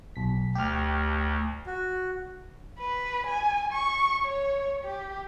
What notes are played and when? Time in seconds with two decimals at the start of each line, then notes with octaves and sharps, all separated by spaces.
0.16 B1 B6
0.55 D2 G4 F6
1.67 F#4
2.79 B4
3.27 G#5
3.73 C#6
4.25 C#5
4.84 G4